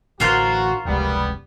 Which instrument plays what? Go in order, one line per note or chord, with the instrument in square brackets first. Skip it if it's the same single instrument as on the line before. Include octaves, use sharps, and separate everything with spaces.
[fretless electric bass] A1 D3 E3 [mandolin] F4 A#4 C5 [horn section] F#4
[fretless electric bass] F1 C#2 [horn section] G3 B3